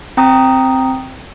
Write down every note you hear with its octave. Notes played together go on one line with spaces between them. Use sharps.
C4 G5 A#5 D#6